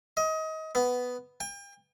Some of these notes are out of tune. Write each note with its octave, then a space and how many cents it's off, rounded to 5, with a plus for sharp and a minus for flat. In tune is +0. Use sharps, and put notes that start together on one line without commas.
D#5 +25
B3 +5
G5 +40